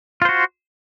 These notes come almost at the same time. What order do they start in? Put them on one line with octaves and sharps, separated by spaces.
F4 C5 F#4